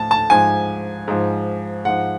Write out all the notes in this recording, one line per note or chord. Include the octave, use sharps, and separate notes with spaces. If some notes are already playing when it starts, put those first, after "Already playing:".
Already playing: A2 F3 A5
A5
G#2 F3 G#5
G#2 F3
G#2 F3 F#5